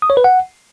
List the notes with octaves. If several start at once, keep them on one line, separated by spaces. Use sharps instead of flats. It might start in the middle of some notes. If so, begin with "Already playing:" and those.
D#6
C#5
B4
F#5